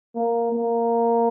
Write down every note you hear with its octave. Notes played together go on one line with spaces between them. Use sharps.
A#3
A#3